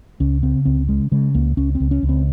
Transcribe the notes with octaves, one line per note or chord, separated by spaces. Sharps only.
C#2 C#4
C#3 C4
C#2 C4
C#3 G#3
C#3 G#3
C#2 A#3
C#2 C#4
C4
C#2
C#4
C#2
C4